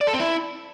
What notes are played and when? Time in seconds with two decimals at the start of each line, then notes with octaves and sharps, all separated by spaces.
0.01 D5
0.07 A4
0.13 C4
0.20 E4